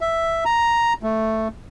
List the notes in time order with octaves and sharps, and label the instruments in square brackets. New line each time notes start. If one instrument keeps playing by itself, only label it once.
[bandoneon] E5
A#5
A3